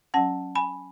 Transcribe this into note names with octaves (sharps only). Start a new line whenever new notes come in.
F#3 C#4 F#5 A5
G#5 B5